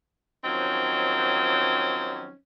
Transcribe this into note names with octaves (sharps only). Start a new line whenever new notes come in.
D#3 F3 F#3 C4 C#4 D#4